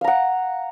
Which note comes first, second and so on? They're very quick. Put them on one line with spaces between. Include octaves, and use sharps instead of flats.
F5 A#5 F#5